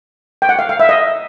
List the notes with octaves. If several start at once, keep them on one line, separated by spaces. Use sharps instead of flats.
G5
F#5
F5
F5
E5
D#5